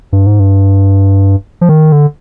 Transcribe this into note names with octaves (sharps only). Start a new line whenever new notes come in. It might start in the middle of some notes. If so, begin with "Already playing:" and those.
G2
G#2
G2
F3
D#3
D3